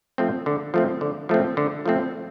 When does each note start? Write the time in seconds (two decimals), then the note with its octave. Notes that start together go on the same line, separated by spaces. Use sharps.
0.18 F3 A3 C4
0.46 D3
0.74 F3 A3 C4
1.01 D3
1.29 F3 A3 C4
1.57 D3
1.85 F3 A3 C4